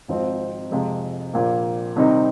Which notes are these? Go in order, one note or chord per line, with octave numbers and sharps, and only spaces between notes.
G#1 G#2 F3 C4 D#4
F2 C3 F3 G#3
A#1 A#2 A#3
C2 C3 D#3 C4 D#4